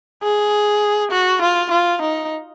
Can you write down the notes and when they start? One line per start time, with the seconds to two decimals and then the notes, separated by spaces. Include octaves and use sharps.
0.23 G#4
1.11 F#4
1.42 F4
1.71 F4
2.02 D#4